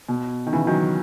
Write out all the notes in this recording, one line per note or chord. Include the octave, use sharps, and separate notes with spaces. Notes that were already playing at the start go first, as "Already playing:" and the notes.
B2
D#3
C#3 E3
D#3 F#3